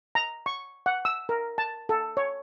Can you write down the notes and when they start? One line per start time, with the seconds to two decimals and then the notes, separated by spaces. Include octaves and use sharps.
0.15 A#5
0.46 C#6
0.86 F#5
1.05 E6
1.29 A#4
1.58 A5
1.89 A4
2.17 C#5